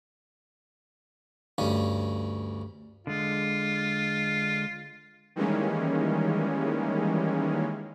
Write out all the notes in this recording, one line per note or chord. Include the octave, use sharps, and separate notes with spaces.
D2 G2 C#4
D3 G#3 F4
D#3 E3 G3 G#3 A#3 C#4